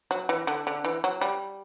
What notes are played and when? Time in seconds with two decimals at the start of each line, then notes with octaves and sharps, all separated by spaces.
0.11 F#3
0.29 E3
0.47 D3
0.67 D3
0.85 E3
1.04 F#3
1.21 G3